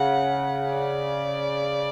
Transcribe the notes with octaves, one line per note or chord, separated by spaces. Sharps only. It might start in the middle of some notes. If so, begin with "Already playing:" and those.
Already playing: C#3 F#5
D5